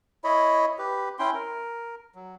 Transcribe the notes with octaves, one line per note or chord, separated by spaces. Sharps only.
E4 C#5 D#5 B5
G4 B4
C#4 E4 G5 C6
A#4
F#3